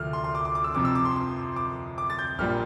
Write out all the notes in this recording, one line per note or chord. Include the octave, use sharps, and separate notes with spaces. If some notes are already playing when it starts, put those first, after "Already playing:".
Already playing: D2 C3 F3 A3 F6
C6
C6
D6
D6
D6
E6
F2 C3 F3 D6
E6
D6
C6
C6
D6
D6
A6
G6
A#1 A#2 G3 A#3 F6